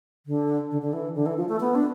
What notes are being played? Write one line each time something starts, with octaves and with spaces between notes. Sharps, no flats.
D3
D3
D3
E3
D3
E3
F3
A3
B3
D4